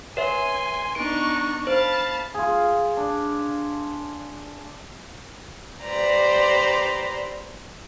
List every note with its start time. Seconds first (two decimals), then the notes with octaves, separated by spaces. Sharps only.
0.17 B4 C#5 E5 G#5 C6
0.95 B3 D4 D#4 C#6 D7
1.67 C5 F5 A5 B5
2.34 F4 G#4
2.97 D4
5.83 G4 B4 C5 D5 A#5